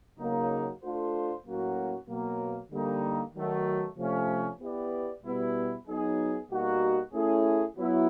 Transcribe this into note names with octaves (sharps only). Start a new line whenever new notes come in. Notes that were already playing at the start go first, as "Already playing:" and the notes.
C#3 F#3 A#3 D#4
A3 D4 F4 A4 C5
A2 F#3 A#3 C#4 F#4
B2 F#3 A#3
D3 G3 A#3 D#4
D#3 F#3 A3
C3 F3 A3 C#4
B3 E4 G4 B4 D5
B2 G3 B3 E4
F#3 B3 D#4 G#4
B2 G3 A#3 D#4 F#4
A3 C#4 E4 G#4
F#3 B3 E4